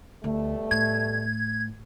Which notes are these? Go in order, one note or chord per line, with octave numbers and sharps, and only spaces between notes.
D2 B2 G3 A3
A2 G#6